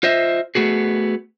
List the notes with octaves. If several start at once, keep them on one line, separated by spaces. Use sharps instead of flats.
F4 C5 D#5 E5
A3 B3 F#4 G#4